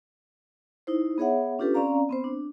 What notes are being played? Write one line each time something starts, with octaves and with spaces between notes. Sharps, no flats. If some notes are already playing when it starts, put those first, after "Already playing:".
D#4 E4 C5
B3 G#4 C#5 E5 F#5
C#4 D4 F4 G4 A4 B4
C4 C#4 D5 F5 A#5
B3 C4 C5
D4